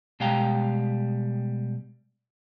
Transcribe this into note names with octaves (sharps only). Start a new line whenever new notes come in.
B2 G3 G#3 F5 G5 A#5